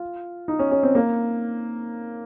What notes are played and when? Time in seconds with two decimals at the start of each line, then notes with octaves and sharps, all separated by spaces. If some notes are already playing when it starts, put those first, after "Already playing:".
Already playing: F4
0.48 D#4
0.59 C#4
0.71 C#4
0.83 C4
0.95 A#3